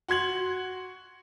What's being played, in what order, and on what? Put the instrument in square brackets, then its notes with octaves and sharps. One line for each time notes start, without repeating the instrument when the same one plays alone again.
[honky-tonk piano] F#4 C6 G#6 F#7